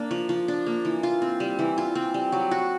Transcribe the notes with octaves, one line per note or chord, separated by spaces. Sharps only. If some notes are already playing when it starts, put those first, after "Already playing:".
Already playing: A#3 D4
F3
F3
D4
A#3
E3
F4
C4
G3
E3
F4
C4
G3
F#3
F#4